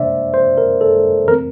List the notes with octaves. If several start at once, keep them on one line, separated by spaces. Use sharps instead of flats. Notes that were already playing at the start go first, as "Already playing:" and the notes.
Already playing: C3 E3 A#3 D4 C5 D5 E5
C5
A#4
A4
E3 A3 C4 A#4